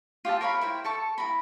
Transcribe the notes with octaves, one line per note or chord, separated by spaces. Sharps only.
F4 G4 E5 A5
A#4 C#5 F5 B5
E4 C5 G5
A4 A5 C#6
E4 G#4 A#5 B5